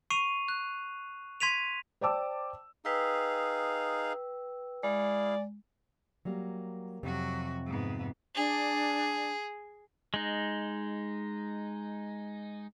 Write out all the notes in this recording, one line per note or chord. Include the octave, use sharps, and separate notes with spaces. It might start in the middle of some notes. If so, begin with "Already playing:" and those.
C#6 C7 D#7 F7
F#6
C6 G#6 B6 D#7 F7
C5 D5 G5 A5 D6 E6
D#4 G#4 B4 F5 G5 E6
G#3 E4 G#4 D5 F5
F#3 G3 A#3
F2 C3 F#3 F#4
G#2 B3
D4 G#4
G#3 D#4